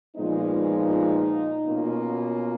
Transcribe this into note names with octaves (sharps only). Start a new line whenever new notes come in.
A#2 F3 G#3 B3 D#4
B2 A#3 C#4 F4